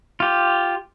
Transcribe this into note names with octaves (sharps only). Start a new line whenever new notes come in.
F4 G4